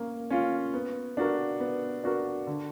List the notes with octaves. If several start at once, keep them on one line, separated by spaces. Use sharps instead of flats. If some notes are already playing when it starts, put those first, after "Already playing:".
Already playing: A#3 C#4
C#4 F4
B3
D4 F#4 A#4
B3
D4 F#4 A#4
D3